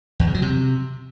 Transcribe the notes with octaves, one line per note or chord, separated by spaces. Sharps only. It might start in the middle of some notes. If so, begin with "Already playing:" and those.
E2
C#3
F#3
C3